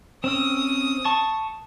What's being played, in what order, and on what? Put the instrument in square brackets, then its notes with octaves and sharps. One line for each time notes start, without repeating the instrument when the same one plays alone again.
[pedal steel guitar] C4 C#4 E6 [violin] D#6
[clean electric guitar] A5 [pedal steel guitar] C#6